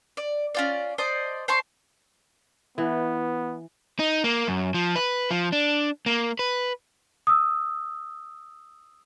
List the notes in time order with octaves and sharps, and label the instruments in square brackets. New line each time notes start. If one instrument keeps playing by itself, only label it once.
[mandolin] D5
C#4 F4 D5
C5 D5 D#5 A5
C5 A5 C6 C#6
[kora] E3 [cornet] B3
[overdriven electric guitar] D#4
A#3
F#2
F3
B4
F3
D4
A#3
B4
[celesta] D#6 E6